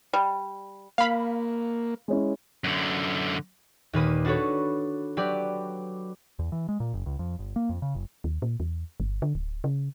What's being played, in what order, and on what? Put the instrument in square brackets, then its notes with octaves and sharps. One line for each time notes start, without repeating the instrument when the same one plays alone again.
[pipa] G3
[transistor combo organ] A#3 [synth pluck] F5 B5
[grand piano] G#3 C#4 E4
[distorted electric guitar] F#2 D3
[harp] D#2 A#2 B4 D#6
D4 F#4 A4 B4 C#5
F#3 G4 B4 D5
[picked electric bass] E2
E3
G#3
A#2
F#1
C#2
F2
G1
A#3
F2
C#3
F#1
[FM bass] D#2
A#2
E2
G1
D3
D1
C#3